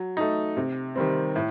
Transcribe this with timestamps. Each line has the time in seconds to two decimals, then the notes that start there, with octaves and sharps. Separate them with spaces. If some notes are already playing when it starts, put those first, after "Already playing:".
Already playing: F#3
0.17 A3 D#4
0.57 C3
0.96 D#3 G3 C4
1.36 A2